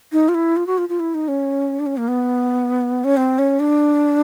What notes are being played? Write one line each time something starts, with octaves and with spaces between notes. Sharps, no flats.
D#4
F4
E4
F4
F#4
F4
F4
E4
D#4
C#4
D4
C#4
A#3
B3
C#4
C4
C#4
D4